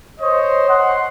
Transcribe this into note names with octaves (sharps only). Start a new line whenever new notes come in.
C5 C#5 D#5
F#5 C6